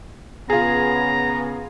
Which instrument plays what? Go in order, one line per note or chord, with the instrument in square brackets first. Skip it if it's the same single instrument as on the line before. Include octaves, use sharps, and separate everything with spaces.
[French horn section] C#3 B3 [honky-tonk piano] F4 G#4 [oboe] A#5